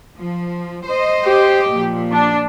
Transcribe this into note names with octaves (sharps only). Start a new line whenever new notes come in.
F3
C5 D#5
G4
A#2 F3
D4